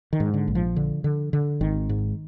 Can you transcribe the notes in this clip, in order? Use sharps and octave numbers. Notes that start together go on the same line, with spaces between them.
D#3
G#2
D3
A#1
F3
D3
D3
D3
G#1 D#3
G#2